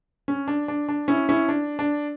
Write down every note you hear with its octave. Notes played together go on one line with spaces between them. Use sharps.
C#4
D4
D4
D4
C#4 E4
C#4 E4
D4
D4